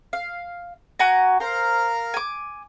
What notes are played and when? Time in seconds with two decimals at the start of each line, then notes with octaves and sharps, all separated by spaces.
0.13 F5
0.99 F#4 G#5 A#5
1.40 A#4 C5 F5 A#5
2.14 G#5 D6